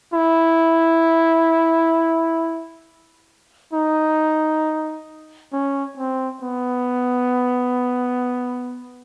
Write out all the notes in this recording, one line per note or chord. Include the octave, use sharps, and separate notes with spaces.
E4
D#4
C#4
C4
B3